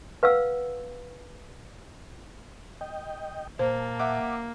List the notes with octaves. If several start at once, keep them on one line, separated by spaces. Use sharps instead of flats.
B4 F5 F#5 E6
D#5 G5
A#2 A#3 C5 A5
E5 F#5 D6